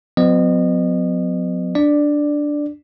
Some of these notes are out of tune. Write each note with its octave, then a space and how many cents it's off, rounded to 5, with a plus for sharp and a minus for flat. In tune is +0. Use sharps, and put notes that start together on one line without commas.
F#3 -40 B3 +45 D#5 -35
D4 +0 D5 +10